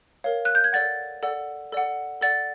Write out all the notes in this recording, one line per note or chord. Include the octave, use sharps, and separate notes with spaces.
A#4 C#5 F5
F#6
G6
G#6
A4 D5 F#5 A6
A4 D5 F#5
A4 D5 F#5
A4 D5 F#5 A6